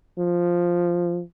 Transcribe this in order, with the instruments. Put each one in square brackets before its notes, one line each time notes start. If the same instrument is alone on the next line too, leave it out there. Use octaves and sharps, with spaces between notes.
[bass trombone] F3